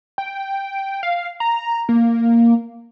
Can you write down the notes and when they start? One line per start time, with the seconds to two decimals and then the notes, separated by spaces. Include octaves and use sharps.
0.18 G5
1.03 F5
1.40 A#5
1.89 A#3